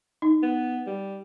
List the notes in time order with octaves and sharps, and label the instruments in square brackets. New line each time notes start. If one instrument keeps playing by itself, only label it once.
[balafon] D#4
[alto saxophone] B3
G3